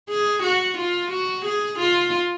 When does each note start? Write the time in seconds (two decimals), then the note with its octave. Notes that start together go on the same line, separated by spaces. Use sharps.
0.09 G#4
0.43 F#4
0.77 F4
1.11 F#4
1.45 G#4
1.79 F4